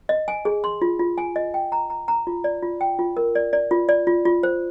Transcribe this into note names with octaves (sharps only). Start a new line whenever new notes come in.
D#5
G#5
G#4
C6
F4
F4
G#5
D#5
G5
A#5
A#5
A#5
F4
D5
F4
G5
F4
A#4
D5
D5
F4
D5
F4
F4
C5